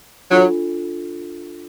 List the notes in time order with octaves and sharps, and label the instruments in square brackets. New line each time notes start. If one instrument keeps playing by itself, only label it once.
[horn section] F#3 [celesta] D4 F4 A4